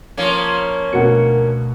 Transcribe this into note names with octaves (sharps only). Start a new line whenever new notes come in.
F3 A#3 C#4
D2 B2 F#4 A#4 F#5 C#7